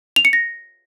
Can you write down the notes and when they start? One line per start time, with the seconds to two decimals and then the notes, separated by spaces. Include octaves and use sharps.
0.16 F7
0.25 C#7
0.33 A#6